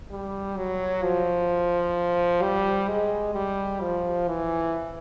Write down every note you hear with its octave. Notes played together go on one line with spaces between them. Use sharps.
G3
F#3
F3
G3
G#3
G3
F3
E3